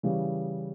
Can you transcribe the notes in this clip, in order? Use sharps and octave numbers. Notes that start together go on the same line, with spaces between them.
C#3 E3 G3